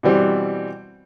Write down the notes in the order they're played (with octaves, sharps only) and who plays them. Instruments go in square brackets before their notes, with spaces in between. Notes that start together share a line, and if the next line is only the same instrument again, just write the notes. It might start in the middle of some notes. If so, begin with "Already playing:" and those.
[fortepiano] B2 E3 G3 C4